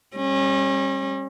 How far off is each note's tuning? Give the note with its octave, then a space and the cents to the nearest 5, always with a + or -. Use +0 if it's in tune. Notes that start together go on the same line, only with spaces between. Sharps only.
G3 +15 C#4 -35